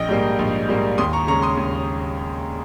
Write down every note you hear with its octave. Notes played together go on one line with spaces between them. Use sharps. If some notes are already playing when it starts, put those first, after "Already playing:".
Already playing: A#1 D#5 G5
G#2 G3 A#3
A#1
G#2 G3 A#3
D#2 C6 D#6
A#5 C#6
C#3 G#3 A#5 C#6
C6 D#6
D#2